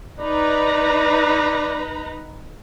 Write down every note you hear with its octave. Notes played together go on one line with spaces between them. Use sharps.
D#4 B4 D5 A#5